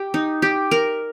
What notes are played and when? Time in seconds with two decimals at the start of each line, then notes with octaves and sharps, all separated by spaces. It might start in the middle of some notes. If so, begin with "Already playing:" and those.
Already playing: G4
0.14 D#4
0.42 G4
0.71 A#4